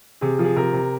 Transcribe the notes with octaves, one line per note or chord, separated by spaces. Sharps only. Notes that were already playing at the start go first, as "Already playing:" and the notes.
C3 G#4
F3
G#4
C3 A#4
C3